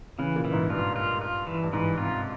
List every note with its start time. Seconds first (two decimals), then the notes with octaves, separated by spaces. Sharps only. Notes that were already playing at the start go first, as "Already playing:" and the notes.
0.19 C#3 E3
0.36 A#2
0.45 E3
0.53 G#2
0.70 G2 F4
0.96 F4
1.21 F4
1.47 E3
1.63 G2
1.73 G#2 E3
1.98 C3 F4